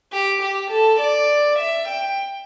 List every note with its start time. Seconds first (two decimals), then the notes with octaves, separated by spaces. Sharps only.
0.13 G4
0.42 G4
0.71 A4
1.00 D5
1.59 E5
1.88 G5